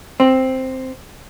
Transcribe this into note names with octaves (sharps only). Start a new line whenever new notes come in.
C4